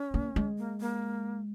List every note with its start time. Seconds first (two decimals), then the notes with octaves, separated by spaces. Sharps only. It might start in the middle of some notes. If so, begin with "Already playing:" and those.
Already playing: C#4
0.14 A#3
0.36 G#3
0.58 A#3
0.81 A#3